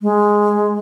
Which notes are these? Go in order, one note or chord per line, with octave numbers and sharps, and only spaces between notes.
G#3